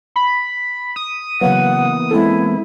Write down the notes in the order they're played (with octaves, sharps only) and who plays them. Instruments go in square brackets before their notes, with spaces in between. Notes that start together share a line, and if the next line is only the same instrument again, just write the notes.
[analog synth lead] B5
D#6
[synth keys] C#3 F#3 [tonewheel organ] E3 A#3 B3 [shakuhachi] F#5
[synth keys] G#3 C4 A4 [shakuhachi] E4